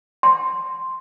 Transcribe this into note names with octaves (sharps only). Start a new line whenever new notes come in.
C6